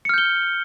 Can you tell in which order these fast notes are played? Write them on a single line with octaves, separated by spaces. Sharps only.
C#7 F6 G6 G7